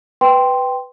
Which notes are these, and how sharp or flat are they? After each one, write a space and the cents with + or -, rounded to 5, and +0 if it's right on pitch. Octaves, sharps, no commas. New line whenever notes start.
B4 +10 G5 +0 C6 -5